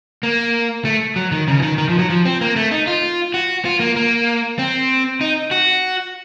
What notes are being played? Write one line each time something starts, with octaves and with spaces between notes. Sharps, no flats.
A#3
A3
F#3
D#3
C#3
F3
D#3
D#3
F3
F#3
F3
C4
A#3
A3
D#4
F4
F#4
F4
A#3
A#3
C4
D#4
F#4